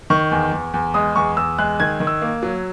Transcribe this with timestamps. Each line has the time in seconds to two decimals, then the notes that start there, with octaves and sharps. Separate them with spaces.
0.10 D#3 C#6
0.32 E2
0.53 E2
0.74 E2
0.94 G#3 D#6
1.16 E2 C#6
1.37 E2 E6
1.59 G#3 F#6
1.80 D#3 G#6
2.00 D#3
2.07 E6
2.22 A#3
2.43 F#3